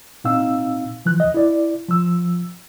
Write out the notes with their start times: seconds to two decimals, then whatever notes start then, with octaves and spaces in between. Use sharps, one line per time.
0.24 A#2 C4 D#4 F5 E6
1.06 E3 F3 F#6
1.20 D2 D#5
1.34 E4 D5
1.88 F3 E6